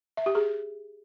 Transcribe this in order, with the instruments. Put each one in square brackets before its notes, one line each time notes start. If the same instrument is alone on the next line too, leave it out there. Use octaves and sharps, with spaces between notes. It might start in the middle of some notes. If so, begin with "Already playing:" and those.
[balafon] E5
G4
G#4